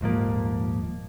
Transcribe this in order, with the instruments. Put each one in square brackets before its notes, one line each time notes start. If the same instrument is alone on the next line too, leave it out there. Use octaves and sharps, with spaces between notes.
[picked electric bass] D#1 G#2 F3 A#3